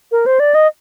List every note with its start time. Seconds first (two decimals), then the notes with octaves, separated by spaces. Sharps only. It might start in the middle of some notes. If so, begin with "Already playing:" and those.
0.12 A#4
0.26 C5
0.39 D5
0.54 D#5